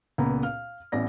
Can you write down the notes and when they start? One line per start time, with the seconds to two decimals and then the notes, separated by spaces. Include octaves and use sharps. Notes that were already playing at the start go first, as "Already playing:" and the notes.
0.18 C#2 A#2 B3 A#5
0.43 F5 F6
0.92 A1 B3 D5 A#6